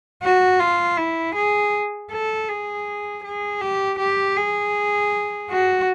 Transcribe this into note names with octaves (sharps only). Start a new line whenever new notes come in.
F#4
F4
E4
G#4
A4
G#4
G#4
G4
G4
G#4
F#4